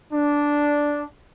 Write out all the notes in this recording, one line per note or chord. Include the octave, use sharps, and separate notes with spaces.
D4